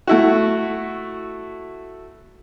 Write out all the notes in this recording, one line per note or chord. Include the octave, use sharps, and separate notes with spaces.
A3 E4 F#4